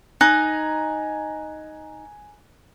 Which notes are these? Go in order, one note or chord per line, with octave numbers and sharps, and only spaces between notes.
D#4 G#5 A#5 F#6